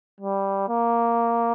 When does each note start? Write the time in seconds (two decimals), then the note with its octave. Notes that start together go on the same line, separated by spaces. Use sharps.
0.20 G3
0.69 A#3